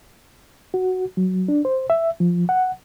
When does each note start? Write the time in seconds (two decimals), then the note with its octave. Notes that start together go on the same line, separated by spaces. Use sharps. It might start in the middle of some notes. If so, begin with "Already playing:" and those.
0.74 F#4
1.17 F#3
1.48 D4
1.65 C5
1.90 E5
2.20 F3
2.49 F#5